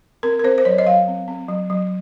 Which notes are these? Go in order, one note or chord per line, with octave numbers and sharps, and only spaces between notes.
C4 A#4
A#4
C4 C5
C5
F#3 C#5
D#5
F#3 F5
C4
C4
F#3
F#3